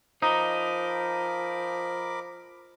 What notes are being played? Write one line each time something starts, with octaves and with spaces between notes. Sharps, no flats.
F3 D#4 A#4 B5 D6